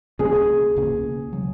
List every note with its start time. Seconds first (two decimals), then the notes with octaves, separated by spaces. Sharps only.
0.19 C#2 B2 A#3 C#4 G#4
0.76 C#2 B2 A#3 C#4
1.33 C#3 F#3